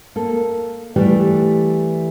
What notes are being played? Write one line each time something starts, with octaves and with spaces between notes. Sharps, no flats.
A#3 A4
E3 G3 A3 G4